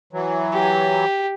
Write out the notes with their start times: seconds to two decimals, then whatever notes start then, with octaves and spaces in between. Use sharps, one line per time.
0.13 E3 F#3
0.53 G4